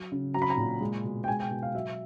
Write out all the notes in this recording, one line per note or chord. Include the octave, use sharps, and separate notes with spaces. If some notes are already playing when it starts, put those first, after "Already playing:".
Already playing: F#3
C#3
F#3 A#5
B5
A#5
A#2
G#3
B2
G5
G#3 G#5
G5
B2
F5
F#3 E5